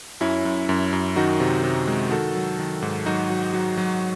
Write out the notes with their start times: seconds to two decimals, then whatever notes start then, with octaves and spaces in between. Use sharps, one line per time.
0.21 F#2 C#4 E4
0.45 F#2
0.69 F#2
0.93 F#2
1.16 D#3 D#4 F#4
1.40 C3
1.64 C3
1.87 G#3
2.11 D#3 F#4 A4
2.35 F#3
2.59 D#3
2.82 G#2
3.06 F#3 D#4 F#4
3.30 F#3
3.54 F#3
3.77 F#3